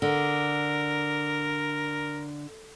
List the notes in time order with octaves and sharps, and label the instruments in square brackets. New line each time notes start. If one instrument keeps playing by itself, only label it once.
[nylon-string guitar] D3 [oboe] A#4